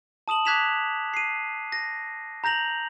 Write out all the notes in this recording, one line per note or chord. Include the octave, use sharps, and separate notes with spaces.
A5 D#6 E7 F#7
D6 F#6 G#6 B6 E7 F7
C7 D#7
A#6
A#5 G6 A#6 F7 F#7